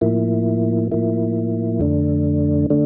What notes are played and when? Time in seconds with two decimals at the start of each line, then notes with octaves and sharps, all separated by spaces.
0.01 A2 F3 A#3 E4
0.91 A2 F3 A#3 E4
1.80 F2 D3 A3 D4
2.70 D3 A3 D4